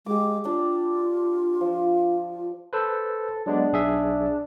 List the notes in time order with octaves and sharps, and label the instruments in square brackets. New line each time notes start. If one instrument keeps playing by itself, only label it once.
[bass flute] G#3 [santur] G4 D6
[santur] D4 [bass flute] F4
[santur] F3
[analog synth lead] A4 [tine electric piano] B4 C5 E6
[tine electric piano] F#3 G#3 B3 [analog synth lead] D4
[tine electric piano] B1 G#4 E5